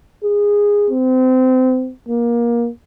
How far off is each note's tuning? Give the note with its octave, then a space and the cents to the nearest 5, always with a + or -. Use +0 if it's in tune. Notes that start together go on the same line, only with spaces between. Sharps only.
G#4 -15
C4 -30
A#3 +20